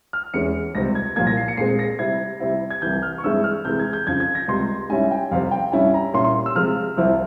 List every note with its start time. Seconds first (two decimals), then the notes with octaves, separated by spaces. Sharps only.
0.13 F6
0.34 E2 E3 G#3 C#4 C#7
0.75 C#2 C3 G3 C4 A#6
0.95 G#6
1.16 C2 A#2 F3 A#3 G#6
1.27 A#6
1.37 C7
1.48 C#7
1.57 A#2 G#3 C4 C7
1.79 A#6
1.99 C3 G3 C4 E4 G#6
2.40 C3 G3 C4 E4
2.70 G#6
2.82 C2 C3 E3 G6
3.03 F6
3.18 C#6
3.24 G2 E3 G#3 C4 E4 E6
3.44 F6
3.65 C3 E3 G#3 G6
3.79 G#6
3.93 G6
4.07 F2 C#3 F3 G#6
4.20 G#6
4.35 A#6
4.48 C#2 C3 G3 C6
4.89 G#2 G3 C#4 E4 G#5
5.11 G5
5.31 F2 C3 G3 C4 F5
5.51 G5
5.72 G2 G3 C#4 E4 G#5
5.94 A#5
6.14 A#2 G3 C#4 E4 C6
6.24 C6
6.46 E6
6.55 C3 F3 G#3 F6
6.97 C2 C3 F3 C4 E4